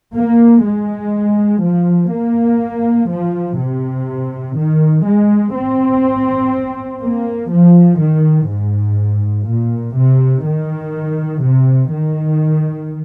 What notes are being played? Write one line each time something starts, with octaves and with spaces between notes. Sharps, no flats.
A#3
G#3
F3
A#3
F3
C3
D#3
G#3
C4
A#3
F3
D#3
G#2
A#2
C3
D#3
C3
D#3